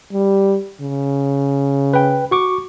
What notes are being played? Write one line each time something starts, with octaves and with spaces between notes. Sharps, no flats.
G3
C#3
B4 G5
F#4 C#6 D6